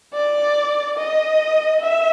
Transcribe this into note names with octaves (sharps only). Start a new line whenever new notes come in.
D5
D#5
E5